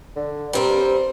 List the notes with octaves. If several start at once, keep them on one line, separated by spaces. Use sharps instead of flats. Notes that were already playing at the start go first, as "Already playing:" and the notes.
D3
G2 G3 C4 A#4
C5